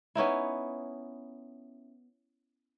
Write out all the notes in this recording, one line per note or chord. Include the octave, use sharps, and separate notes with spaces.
B3 C#4 D#4 E4